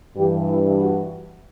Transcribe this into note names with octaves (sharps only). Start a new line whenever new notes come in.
G2 E3 G4
E4
F#4